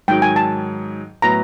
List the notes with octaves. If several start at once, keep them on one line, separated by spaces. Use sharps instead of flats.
G#2 D#3 F#3 G5
G#5
A5
A2 F#3 B3 A#5